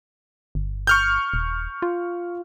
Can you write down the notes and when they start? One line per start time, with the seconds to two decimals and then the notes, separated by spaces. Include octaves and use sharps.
0.55 G1
0.87 C#6 F6 G6
1.34 D#1
1.82 F4